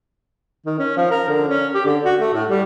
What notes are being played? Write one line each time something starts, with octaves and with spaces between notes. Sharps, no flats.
D#3
C#4
F3
A#4
D3
C#4
G4
D3
F#4
A3
A2
G3